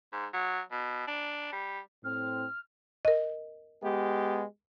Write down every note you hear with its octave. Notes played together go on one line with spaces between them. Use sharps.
G#2
F#3
B2
D4
G3
A2 C4 F6
A#4 D#5
G#3 B3 G4